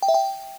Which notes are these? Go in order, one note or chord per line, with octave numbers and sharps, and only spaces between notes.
G5
E5
G5